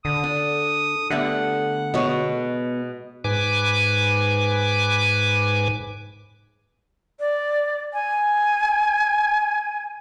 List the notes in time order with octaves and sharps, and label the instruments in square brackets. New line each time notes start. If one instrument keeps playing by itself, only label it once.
[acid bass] D3 [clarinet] D#6
[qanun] D4
[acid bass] D3 [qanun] G3 A3 B3 [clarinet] F#5
[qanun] B2 G#3 [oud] B3 C#5
[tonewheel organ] G#2 B4 G#5 D6
[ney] D5
G#5